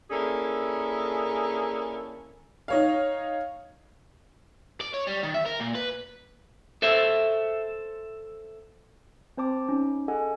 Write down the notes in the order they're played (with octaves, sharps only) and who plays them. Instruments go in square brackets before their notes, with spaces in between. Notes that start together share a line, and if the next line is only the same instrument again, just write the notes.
[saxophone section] A#3 C#4 D4 E4 G#4 A4
[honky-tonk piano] D#4 C#5 F5
[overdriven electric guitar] D5
C#5
G3
D#3
E5
A#4
A#2
B4
[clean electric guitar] A4 C5 E5
[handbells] C4 C5 A5 D6
C#4 D#4
G#4 A4 D#5 F#5 G#5